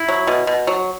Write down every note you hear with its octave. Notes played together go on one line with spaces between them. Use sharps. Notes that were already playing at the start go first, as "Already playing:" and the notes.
Already playing: E4
F#3
B2
B2
F#3